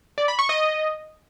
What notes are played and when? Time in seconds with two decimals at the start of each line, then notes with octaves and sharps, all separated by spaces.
0.18 D5
0.28 B5
0.39 C#6
0.49 D#5